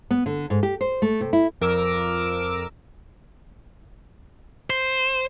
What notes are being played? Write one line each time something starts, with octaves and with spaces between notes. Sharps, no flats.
B3
D3
G#2
G4
C5
A3
C3
E4
F2 A#4 D6 E6
C5